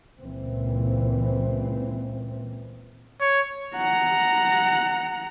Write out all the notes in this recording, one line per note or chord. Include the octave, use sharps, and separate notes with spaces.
C#2 A#2 E3 C4
C#5
F#5 A#5